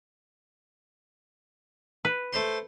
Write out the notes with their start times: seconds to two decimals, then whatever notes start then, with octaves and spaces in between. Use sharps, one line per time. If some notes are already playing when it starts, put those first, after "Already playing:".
2.05 B4
2.33 A3 C5 C6